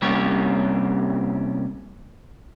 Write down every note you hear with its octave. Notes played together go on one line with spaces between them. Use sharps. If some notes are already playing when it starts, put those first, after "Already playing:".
C3 G3 A#3 C#4 G4 C#5